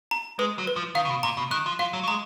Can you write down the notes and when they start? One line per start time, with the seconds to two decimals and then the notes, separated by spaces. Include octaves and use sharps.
0.11 A#5
0.39 G#3 B4
0.58 F#3
0.67 B4
0.76 F3
0.95 D#3 F5
1.05 C#3
1.10 B2
1.23 A#2 A#5
1.37 B2
1.51 D#3 F#6
1.66 F3
1.79 F3 F5
1.93 F#3
2.03 F#3
2.08 G#3 A#5